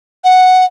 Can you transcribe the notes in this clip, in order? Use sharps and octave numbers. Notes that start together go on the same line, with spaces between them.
F#5